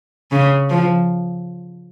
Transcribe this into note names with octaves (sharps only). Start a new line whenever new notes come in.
C#3
F3